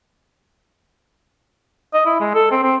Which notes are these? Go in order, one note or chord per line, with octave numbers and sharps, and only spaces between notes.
D#5
E4
G#3
A4
C4
C4